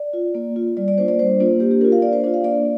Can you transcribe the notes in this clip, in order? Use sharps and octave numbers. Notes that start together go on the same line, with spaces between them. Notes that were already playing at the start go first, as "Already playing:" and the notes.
Already playing: D5
F4
A#3
F4
G3 D5
D5
A#3 D4 F4 C5
D5
G3 C5
A#3 D4 F4
A#3 G4
G4
D4 F4 A#4
F5
A#3 D5
C5
D4 F4 D5
F5
A#3 D5